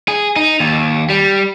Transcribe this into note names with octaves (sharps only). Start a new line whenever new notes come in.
G#4
D#4
D#2
G3